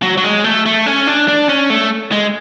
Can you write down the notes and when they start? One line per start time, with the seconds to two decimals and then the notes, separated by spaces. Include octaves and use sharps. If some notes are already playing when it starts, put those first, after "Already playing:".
0.03 F#3
0.17 F#3
0.24 G#3
0.44 A3
0.66 A3
0.86 C#4
1.07 D4
1.28 D4
1.49 C#4
1.70 A3
2.12 G#3